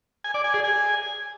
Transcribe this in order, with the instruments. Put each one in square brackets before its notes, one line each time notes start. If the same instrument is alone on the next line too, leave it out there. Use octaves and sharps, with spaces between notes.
[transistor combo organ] G#5
D5
G#5
G#4
G#5